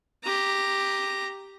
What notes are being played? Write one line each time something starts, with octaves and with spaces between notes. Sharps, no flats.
G4 A#5